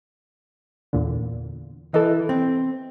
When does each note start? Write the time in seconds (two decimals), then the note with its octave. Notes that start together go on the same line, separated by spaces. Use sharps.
0.93 E2 A#2 D3
1.94 E3 A4 D#5
2.29 C4